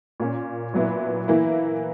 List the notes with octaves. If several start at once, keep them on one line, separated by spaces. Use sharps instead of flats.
A#2 A#3 C#4
A#2 F#3 B3 E4
E3 A#3 E4